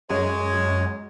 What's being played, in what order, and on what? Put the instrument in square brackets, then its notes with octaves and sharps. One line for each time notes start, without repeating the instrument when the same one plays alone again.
[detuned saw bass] F#2 [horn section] G#3 [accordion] C#5